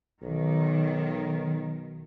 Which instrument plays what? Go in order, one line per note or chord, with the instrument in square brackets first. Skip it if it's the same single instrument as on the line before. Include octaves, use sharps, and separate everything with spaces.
[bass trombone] B1 [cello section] D#3